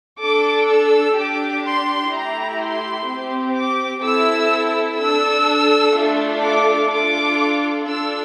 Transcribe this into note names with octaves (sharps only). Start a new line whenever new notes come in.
D4 A4 D6
E6
D4 G4 D6
C6
A3 E4 G4 A#5
C6
C4 G4
D6
C4 E4 A4 E6
D4 A4 E6
A3 D4 F4 A4
D6
D4 F4 A4 D6
D4 F4 A4 E6